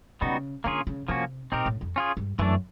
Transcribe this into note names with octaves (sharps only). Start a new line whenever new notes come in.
C#3 G3 B3 D#4 F#4
D3 A#3 C#4 F4 G#4
C#3
C3 F3 A#3 C#4 F#4
A#2 C4 D#4 G4 A#4
A2
F2
C#4 F4 G#4
G2
F#2 E3 A3 D4